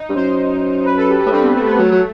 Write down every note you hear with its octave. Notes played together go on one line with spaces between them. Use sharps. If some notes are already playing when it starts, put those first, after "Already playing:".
Already playing: D#4
G2
F#2 C5
B4
A4
G4
G4
A2
G2 C4
B3
A3
B3
F#3 A3
F#3